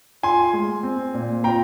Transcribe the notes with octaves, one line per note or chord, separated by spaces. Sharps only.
F4 G#5 C6
G#3
C4
A#2
F4 G5 A#5